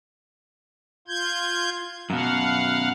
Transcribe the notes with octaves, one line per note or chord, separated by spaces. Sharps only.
F4 G6 G#6
F#2 B2 F5 F#5